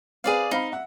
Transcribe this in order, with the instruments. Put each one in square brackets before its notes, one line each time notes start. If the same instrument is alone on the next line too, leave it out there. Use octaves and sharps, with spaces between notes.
[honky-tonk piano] C4 B4 [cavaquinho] G#4 D5 F5
[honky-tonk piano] C4 F5 B5 [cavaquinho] D#4
[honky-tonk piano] E5 F#5